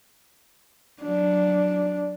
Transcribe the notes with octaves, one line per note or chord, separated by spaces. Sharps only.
F#3 D4